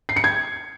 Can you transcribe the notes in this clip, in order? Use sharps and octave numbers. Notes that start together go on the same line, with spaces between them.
C7
C#7
G#6